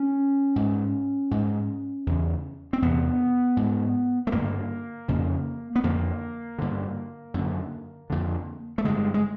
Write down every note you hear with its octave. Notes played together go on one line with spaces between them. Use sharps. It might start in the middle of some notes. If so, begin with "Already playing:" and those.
Already playing: C#4
G#2
G#2
E2 C#3
C4
E2 C3 B3
G#2
A3
G2 D3 A#3
F2 C#3
B3
F2 D3 A#3
G2 D3
F#2 D3
F2 D3
A3
G2 D3 G#3
G#3